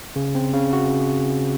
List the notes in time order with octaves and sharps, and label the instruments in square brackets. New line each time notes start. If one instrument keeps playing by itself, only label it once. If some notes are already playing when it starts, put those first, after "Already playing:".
[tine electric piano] C#3
C4
C#3
F#4